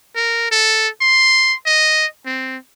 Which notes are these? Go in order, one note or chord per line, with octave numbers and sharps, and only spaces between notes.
A#4
A4
C6
D#5
C4